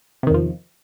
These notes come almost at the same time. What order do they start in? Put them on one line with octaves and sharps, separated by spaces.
C3 D#3 E2 F3